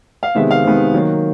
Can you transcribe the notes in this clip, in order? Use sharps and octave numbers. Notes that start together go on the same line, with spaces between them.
F5
C3 D#3 G#3 B3 E5
F5
C3 D#3 G#3 B3
D#3 F#3 A#3